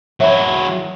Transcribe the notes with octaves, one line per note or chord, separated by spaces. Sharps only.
F#3 E4 C#5 E5 F5